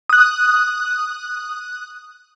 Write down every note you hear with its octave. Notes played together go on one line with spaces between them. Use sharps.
D#6 F#6